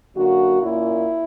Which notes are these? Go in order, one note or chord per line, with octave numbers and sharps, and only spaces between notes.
F#2 D3 A#3 F#4
A#2 A#3 C#4 E4